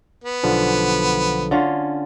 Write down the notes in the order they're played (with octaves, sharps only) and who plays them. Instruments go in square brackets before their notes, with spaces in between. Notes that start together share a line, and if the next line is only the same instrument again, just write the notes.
[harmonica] B3
[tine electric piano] B1 D3 F3
[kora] D3 C#4 F4